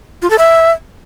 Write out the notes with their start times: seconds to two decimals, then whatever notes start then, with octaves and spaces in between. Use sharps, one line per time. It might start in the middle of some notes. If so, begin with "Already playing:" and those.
0.22 F4
0.30 A4
0.39 E5